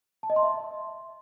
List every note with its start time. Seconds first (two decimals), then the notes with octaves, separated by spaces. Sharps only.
0.23 A5
0.30 D#5
0.36 C6
0.43 E5